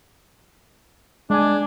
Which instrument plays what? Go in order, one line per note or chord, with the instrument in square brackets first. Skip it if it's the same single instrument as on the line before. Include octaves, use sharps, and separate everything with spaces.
[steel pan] G#3 G#5 [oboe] D4